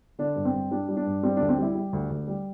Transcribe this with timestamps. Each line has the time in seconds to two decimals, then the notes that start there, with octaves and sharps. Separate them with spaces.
0.19 D3 D4
0.36 G2
0.45 C4
0.54 G2
0.71 G3 D4
0.89 G3
0.97 D4
1.06 G2
1.23 G3 C4
1.37 D2 D4
1.49 C4
1.58 G3 E4
1.75 G3 G4
1.93 D2
2.10 D2
2.28 G3